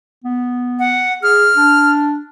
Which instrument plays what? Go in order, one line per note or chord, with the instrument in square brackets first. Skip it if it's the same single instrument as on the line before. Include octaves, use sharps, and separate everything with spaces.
[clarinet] B3
[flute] F#5
[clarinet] G#4 [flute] F6
[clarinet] D4